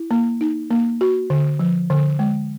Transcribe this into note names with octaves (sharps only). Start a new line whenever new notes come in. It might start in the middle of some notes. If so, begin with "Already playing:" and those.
Already playing: E4
A#3
D#4
A#3
F#4
D3
F3
D3
G#3